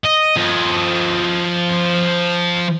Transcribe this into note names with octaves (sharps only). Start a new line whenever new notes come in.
D#5
F3 D#5